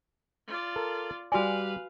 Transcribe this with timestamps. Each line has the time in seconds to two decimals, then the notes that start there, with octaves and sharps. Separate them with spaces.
0.47 F4 D5
0.76 A4 A#4
1.32 G3 F#4 B4 D5 F5 G#5